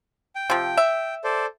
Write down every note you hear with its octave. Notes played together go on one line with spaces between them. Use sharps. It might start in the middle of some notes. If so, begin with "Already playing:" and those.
G5
C3 F3
E5
A4 C5 D5